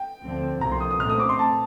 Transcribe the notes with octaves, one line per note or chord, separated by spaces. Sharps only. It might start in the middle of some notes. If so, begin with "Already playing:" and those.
Already playing: G5
D2 D3 F3 C4
C2 C3 F3 A#3 A#5
C6
D#6
D#6
A#2 A3 C4 F6
D#6
D6
C6
A5